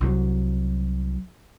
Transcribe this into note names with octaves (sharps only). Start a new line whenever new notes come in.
C2 F#3